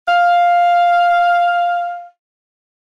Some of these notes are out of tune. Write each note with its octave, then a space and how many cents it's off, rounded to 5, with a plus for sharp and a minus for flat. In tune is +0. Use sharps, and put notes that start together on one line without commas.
F5 +5